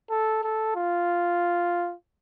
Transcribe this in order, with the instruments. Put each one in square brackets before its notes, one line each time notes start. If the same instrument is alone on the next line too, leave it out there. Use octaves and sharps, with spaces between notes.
[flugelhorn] A4
A4
F4